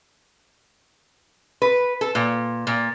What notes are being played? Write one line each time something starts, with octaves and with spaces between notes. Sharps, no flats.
B4
A4
A#2
A#2